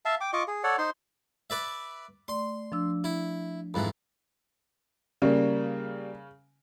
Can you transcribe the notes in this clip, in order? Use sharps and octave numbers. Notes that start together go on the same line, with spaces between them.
E5 F5 A5
G5 D6
F4 D#5 C#6 D6
G#4
A4 C#5 D5 F#5
D#4 C5 C6
B4 D5 E5
A3 D5 C6
F3 D4 E6
E4
F2 G#2 E3 B5
C#3 G3 A#3